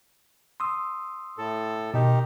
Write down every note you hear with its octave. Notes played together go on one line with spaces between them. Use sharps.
C6 D#6 E6
A2 A4
B2 D#3 D#4 G4